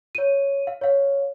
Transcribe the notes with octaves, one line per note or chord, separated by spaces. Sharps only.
C#5 D#7
F5
C#5 F5